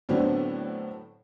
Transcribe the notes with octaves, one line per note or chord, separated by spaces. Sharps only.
A2 D3 F#3 B3 C4 D4